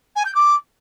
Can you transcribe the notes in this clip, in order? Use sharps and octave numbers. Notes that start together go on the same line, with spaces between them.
G#5
G6
D6